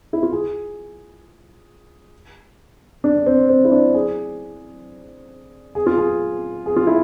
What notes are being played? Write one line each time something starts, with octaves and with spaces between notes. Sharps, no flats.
E4
F4
G#4
D4
C4
C4
E4
D4
G#4
G#4
F4
G#4
G#4
F4
E4